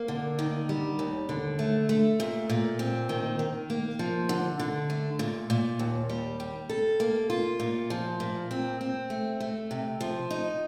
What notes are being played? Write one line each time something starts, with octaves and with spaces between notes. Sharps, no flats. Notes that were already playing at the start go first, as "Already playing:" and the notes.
Already playing: A#3
D3
D#3
G3
D#2
D3
A3
A3
A#2
A#2
C4
D#3
D#3
A#3
F3
D3
D3
A3
A#2
A#2
D#2
G3
G3
A4
A#3
F4
A#2
F3
A#2
C4
C4
A3
A3
C3
F3
D#4